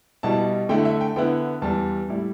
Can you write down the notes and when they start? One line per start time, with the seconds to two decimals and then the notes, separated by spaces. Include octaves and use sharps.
0.23 B2 G3 E4 A5
0.69 D3 A3 E4 G5
0.85 E5
1.01 G5
1.16 D3 B3 E4 G5
1.62 E2 E3 G3 A5
2.08 A2 G3 E4